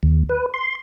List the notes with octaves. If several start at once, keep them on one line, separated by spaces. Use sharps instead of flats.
D#2
B4
C6